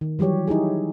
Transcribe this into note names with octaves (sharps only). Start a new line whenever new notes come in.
D#3
E3 F#3 G3 G4 C#5
D#4 E4 G4 G#4